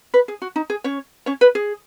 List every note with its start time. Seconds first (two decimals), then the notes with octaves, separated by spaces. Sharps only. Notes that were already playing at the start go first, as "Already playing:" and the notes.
0.14 B4
0.28 G#4
0.42 F#4
0.56 D#4
0.70 G#4
0.84 C#4 C#5
1.26 C#4 C#5
1.41 B4
1.55 G#4